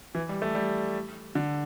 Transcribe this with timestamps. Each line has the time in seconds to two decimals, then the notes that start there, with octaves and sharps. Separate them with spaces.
0.15 E3
0.29 G3
0.42 A3
0.55 G3
1.35 D3